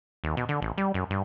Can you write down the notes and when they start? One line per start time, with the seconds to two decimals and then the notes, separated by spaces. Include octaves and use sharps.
0.24 D#2
0.37 B2
0.49 D3
0.62 A1
0.78 G3
0.94 F#2
1.10 G2